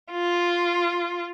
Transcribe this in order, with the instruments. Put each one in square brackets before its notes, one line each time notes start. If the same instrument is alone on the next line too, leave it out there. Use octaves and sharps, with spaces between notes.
[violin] F4